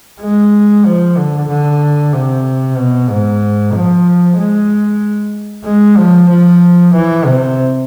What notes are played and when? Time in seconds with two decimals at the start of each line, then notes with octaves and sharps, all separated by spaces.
0.20 G#3
0.85 F3
1.17 D3
1.49 D3
2.14 C3
2.77 B2
3.09 G#2
3.74 F3
4.38 G#3
5.65 G#3
5.97 F3
6.30 F3
6.94 E3
7.26 C3